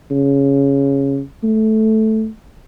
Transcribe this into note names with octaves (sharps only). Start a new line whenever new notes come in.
C#3
A3